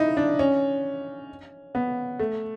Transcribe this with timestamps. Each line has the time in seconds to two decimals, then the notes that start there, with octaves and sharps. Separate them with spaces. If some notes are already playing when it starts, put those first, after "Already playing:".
Already playing: D#4 E4
0.17 D4
0.39 C#4
1.75 B3
2.19 A3